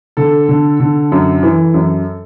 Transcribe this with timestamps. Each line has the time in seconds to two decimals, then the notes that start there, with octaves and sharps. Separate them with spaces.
0.17 D3 A4
0.49 D3
0.80 D3
1.12 F#2
1.43 E3
1.74 F#2